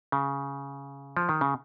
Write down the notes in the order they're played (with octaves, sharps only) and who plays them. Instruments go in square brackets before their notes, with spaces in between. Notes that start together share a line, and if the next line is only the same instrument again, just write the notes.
[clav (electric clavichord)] C#3
F3
D#3
C#3